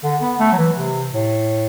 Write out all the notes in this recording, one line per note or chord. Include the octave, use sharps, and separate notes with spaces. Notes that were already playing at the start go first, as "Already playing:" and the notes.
D3
B3
A3
F#3
E3
C3
A2